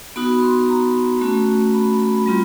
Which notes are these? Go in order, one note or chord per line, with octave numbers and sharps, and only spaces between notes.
B3 D#4 F#4 B5
C6
A#5
A3 C#4 F#4
B5
B5
G3 C4 F4